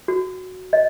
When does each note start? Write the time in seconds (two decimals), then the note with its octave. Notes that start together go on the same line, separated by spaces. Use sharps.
0.08 F#4
0.73 D#5